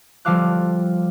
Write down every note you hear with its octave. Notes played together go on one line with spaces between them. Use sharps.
F3 G3 A4 F5 D6 F#6